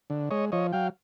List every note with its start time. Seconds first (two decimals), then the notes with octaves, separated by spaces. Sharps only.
0.10 D3
0.31 G#3 C#5 D#5
0.52 F3 C#5 D#5
0.72 F#3 F5 G5